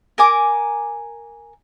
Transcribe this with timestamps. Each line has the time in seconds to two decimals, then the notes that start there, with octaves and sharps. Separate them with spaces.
0.18 A#4 G#5 D6